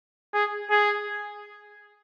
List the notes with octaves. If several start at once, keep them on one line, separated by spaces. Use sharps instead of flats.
G#4
G#4